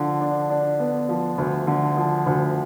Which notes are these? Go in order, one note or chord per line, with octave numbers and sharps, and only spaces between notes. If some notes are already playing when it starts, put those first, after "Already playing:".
Already playing: D3 F3
D4
D4
B3
F3
D2
D3
F3
D2